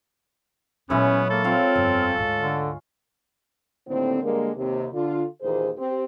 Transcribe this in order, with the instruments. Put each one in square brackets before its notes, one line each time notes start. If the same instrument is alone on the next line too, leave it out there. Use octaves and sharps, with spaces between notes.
[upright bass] A#2 F#3 [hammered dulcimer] G#3 E4 C#5 [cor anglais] B3 [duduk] C#4
[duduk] A#3 [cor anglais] A4
[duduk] C4 [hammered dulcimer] F4 C#5 F5
[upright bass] G1 F2
D2 G#2
[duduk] D3
[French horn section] D#2 A2 D3 C4
D3 G3 G#3 A#3
D#2 C3
D3 F4
D#2 A#2 E3 A#3 G#4 C5
C4 G4